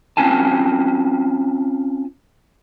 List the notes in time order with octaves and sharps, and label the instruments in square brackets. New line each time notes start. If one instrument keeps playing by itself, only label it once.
[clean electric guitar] C4 C#4 F4 G#5 A5